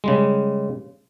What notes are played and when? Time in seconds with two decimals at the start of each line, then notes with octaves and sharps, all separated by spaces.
0.04 C#3 G3 G#3